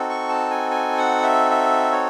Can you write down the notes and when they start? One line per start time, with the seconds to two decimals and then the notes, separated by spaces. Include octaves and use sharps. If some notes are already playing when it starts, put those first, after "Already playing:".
Already playing: C4 D#4 F#4 A4
0.10 C#6
0.29 A5
0.50 G#5
0.71 G#5
0.97 F#5
1.23 E5
1.50 E5
1.92 C#5